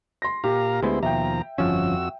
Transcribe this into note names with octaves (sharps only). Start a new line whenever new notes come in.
C6 A#6
A#2 G4 F5 A#5
D2 G#3 B3 E4 C5
D#2 B2 F3 E5 G5 A#5
G1 F2 F3 C#4 F#4 E6